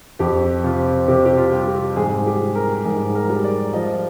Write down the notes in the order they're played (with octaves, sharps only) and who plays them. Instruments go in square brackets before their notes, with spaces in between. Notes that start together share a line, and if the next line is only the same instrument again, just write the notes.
[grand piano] F2 G4
C3 F4
C3 G4
G4
F4
G3
G4
G#2 G#4
G4
G3
A#4
G#2 G#4
A#4
G3
D5
F3 D#5